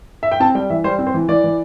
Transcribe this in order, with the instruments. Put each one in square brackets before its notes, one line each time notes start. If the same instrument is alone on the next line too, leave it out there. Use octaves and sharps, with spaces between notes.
[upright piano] E5
G5
C4 A5
G3 G5
E3 E5
G3 C5
C4
C5
E3
E3 D5
E3